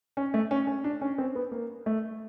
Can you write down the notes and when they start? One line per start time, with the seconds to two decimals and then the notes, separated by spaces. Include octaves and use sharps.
0.17 C#4
0.34 A3
0.51 C#4
0.67 C#4
0.84 D4
1.01 C#4
1.18 C4
1.35 B3
1.51 A#3
1.86 A3